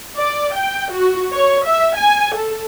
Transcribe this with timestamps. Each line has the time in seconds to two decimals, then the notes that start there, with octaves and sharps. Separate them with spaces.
0.17 D5
0.54 G5
0.91 F#4
1.32 C#5
1.65 E5
1.97 G#5
2.35 A4